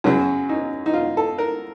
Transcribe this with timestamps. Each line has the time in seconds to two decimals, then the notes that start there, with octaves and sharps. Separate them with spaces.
0.04 F#2 C#3 F#3 C#4
0.49 D#4
0.86 D#4
0.94 F4
1.17 A4
1.38 A#4